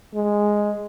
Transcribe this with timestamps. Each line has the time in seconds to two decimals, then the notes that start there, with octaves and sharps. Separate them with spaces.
0.15 G#3